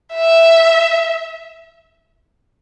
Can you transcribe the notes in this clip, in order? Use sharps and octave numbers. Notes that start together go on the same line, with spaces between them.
E5